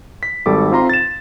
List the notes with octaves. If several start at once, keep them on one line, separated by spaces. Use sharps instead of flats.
B6
G#1 G3 A4 D6
C4 F4 A#5 C6
A6 E7